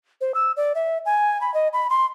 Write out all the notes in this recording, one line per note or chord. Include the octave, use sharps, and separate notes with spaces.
C5
E6
D5
E5
G#5
B5
D#5
B5
C6